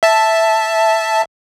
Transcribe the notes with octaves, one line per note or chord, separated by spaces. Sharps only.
E5 A5